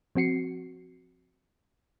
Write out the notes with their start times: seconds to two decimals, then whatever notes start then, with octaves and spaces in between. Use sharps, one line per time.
0.15 F3 C4 F#4 C7 C#7